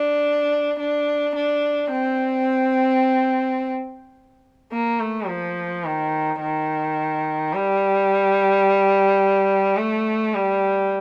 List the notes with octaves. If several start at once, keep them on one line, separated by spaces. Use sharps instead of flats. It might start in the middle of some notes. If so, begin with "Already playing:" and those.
Already playing: D4
D4
D4
C4
A#3
A3
F3
D#3
D#3
G3
A3
G3